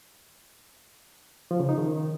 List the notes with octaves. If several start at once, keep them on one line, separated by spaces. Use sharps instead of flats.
F3
C#3
D#4
D#3